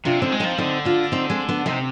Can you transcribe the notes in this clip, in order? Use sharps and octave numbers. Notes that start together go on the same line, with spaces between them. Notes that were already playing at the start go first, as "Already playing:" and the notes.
C3 D4 F4
D3 C4 D#4
G#3
F3 C4 D#4
D3 C4 D#4
D4 F4
C4 D#4
G#3 C4
B3 D4
C3 C4 D#4